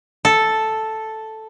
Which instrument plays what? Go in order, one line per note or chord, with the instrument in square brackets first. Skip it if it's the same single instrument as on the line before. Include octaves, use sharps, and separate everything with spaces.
[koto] A4